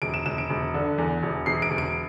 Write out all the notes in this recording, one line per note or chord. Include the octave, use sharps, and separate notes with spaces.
E1 D7
E7
E1 E7
D7
E1
D3
E2
E1
E1 C7
D7
E1
D7